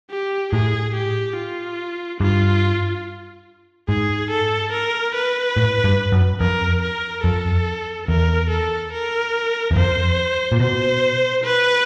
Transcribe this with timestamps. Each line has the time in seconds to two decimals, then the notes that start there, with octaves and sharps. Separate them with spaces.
0.11 G4
0.53 A2 G#4
0.95 G4
1.37 F4
2.21 G2 F4
3.88 G#2 G#4
4.31 A4
4.73 A#4
5.15 B4
5.57 A2
5.84 G2
6.12 F#2
6.40 F2 A#4
6.82 A#4
7.24 F2 A4
8.08 E2 A#4
8.50 A4
8.93 A#4
9.71 E2
9.76 F2 C5
10.52 A#2
10.60 B2 C5
11.44 B4